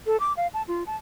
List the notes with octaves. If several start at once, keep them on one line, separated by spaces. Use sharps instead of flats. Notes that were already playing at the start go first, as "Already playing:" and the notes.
A4
D6
F5
A5
F4
A5